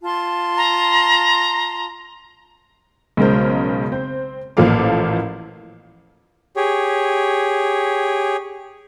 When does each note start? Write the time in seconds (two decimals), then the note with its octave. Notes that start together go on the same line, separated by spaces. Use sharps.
0.03 F4 A5 C6
0.57 A#5
3.17 B1 C#3 G#3 A#4 C5
3.92 C4 C5
4.57 A1 A#2 F3 A4 F5 D6
6.56 G4 G#4 C#5